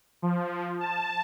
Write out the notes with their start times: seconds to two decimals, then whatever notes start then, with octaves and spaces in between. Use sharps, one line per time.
0.22 F3
0.81 A5